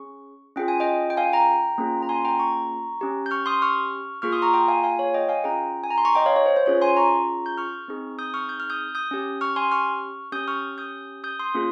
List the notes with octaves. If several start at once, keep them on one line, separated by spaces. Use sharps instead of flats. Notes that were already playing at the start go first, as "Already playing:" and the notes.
Already playing: C#4 G#4 C#6
C#4 F4 G#4 G5
G#5
D#5 G5
G5
F5 G#5
G5 A#5
A#3 C#4 F4 G#4
A#5
G#5 C6
G5 A#5
A#5 C#6
C#4 G4
G6
C#6 F6
C6 D#6
C#6 F6
A#3 F4 G#4 C#6 F6
C6 D#6
A#5 C#6
G5 A#5
F5 G#5
F5 G#5
C#5 F5
D#5 G5
F5 G#5
C#4 F4 G#4 G5 A#5
G#5
A#5
C6
A#5 C#6
D#5 G5
C#5 F5
C#5
C5
C5
C#4 F4 G#4 C#5
G#5 C6
A#5 C#6
G6
C#6 F6
C4 D#4 G#4
D#6 G6
C#6 F6
G6
F6
D#6 G6
D#6 G6
C#4 G4
C#6 F6
G#5 C6
C#6 F6
C#4 G4 D#6 G6
C#6 F6
D#6 G6
D#6 G6
C6 D#6
A#3 C#4 F4 G#4